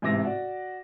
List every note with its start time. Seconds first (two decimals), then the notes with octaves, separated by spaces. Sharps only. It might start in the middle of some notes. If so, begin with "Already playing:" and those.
0.02 A1 G#2 C3 D6 A#6
0.25 F#4 D5